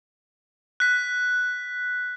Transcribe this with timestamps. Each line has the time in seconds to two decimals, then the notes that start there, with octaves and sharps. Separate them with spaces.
0.80 F#6 B6